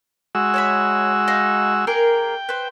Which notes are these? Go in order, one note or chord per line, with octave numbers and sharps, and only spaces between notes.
G#3 F#4 E6
C#5 E5 B5
D#4 F5
A#3 G#4 A#4 G5
B4 C5